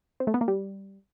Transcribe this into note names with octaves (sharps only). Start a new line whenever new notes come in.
C4
A3
B3
A#3
G3